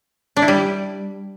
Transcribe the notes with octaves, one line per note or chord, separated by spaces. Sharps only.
D4
E4
G3